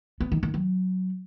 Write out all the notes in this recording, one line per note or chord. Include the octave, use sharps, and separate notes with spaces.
B3
D#3
D#3
F#3